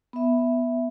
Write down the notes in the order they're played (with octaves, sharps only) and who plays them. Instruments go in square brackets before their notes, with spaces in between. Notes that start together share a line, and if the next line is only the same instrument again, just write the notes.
[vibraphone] B3 E5